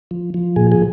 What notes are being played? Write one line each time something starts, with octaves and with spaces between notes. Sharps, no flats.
F3
F3
A#2 G#4
G#4